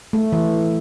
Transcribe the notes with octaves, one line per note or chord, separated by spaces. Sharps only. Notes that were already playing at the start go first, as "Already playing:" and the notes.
A3
E3